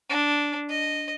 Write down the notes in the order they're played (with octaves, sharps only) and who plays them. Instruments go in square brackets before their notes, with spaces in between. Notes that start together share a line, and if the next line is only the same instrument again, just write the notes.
[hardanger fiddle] D4
D#5